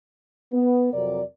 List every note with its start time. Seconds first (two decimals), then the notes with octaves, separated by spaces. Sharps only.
0.53 B3
0.93 F2 C3 F#3 A#4 D5